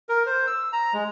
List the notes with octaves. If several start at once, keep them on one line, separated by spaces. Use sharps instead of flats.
A#4
C5
E6
A#5
G#3